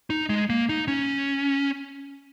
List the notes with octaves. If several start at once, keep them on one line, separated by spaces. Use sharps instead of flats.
D#4
G#3
A#3
D#4
C#4